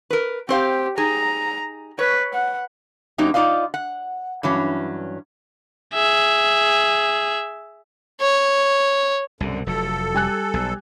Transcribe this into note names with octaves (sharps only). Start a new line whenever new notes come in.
A#4 B4
C4 G4 C5 F5
D#4 G#4 A#5
B4 C#5
F#5
F#2 F#3 A#3 D#4 G4
D#4 F4 D5 D#5 F5
F#5
G2 E3 F#3 C#4
G#4 E5
C#5
C2 F#2 B2 D3
F1 F#3 A4
G3 G#5 F#6
B1